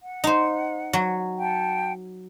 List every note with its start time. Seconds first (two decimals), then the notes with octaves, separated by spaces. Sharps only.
0.02 F#5
0.24 D#4 C5
0.93 F#3
1.39 F#5 G5 A5